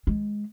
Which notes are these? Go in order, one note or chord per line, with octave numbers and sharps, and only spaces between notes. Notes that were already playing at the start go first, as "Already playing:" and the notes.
G#3